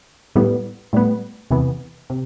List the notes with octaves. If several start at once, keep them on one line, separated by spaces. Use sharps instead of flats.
A2 G3 B3
A2 G3 B3
E2 C3 E3 B3
C3